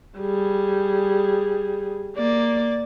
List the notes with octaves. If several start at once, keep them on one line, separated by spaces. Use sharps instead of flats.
G3 G#4
A#3 D5